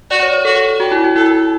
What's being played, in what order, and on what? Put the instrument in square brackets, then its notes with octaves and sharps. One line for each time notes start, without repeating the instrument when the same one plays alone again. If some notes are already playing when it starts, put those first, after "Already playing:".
[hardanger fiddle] F#4 [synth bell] D5
[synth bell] C#5
C#5
[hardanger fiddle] F#4 [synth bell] A4
[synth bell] F#4 [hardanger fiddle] G4
[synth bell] E4
F#4
[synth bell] E4 [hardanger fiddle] A4